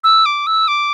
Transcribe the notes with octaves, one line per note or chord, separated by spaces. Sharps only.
E6
D6
E6
D6